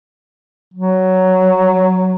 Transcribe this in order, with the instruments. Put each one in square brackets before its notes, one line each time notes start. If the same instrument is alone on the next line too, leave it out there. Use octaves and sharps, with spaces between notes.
[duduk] F#3